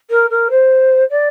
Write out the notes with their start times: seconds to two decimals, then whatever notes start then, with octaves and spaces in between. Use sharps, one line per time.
0.10 A#4
0.30 A#4
0.50 C5
1.10 D5